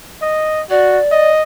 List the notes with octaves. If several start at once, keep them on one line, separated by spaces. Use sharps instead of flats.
D#5
F#4 D5
D#5